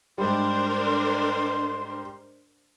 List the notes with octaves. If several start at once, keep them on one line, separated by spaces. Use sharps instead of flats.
G#2 G3 D4 A#4 C5 C6